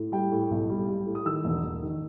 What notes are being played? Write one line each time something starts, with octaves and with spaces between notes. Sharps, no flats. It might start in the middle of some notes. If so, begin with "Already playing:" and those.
Already playing: A2
G3 G5
A2
B1
G3
G3
A2
D#6
D#3 E6
E1
E1
D#3